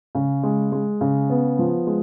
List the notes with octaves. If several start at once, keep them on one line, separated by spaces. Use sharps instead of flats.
C#3
G#3
G#3
C#3
B3
F3
G#3